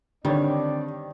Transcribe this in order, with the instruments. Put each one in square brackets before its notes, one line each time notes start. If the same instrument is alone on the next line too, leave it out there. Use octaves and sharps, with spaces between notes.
[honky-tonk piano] D3 [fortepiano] D#3 C#5 [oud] G3 [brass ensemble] C4 D4 D5